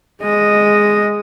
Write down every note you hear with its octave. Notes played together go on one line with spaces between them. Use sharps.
G#3 D#5